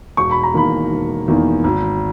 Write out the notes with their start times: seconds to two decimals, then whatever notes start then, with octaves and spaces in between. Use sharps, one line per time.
0.17 E1 C#6
0.31 B5
0.43 A#5
0.54 E2 D#3 A#3 B5
0.91 E1
1.28 E2 D#3 A#3
1.64 G#1